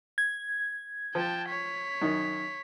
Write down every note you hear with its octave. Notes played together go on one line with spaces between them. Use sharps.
G#6
F3 G5 A5
C#5 B6
F#2 D#3 D#4